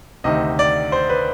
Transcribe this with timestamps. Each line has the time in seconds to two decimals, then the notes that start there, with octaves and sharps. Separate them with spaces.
0.24 D2 C3 D#3 D#5
0.59 D5
0.92 C5
1.09 B4